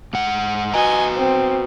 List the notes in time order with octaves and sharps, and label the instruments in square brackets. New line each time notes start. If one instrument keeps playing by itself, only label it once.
[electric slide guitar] G#2 F#5
[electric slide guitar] F#4 B4 A#5 [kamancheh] D#5 G#5
[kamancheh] C4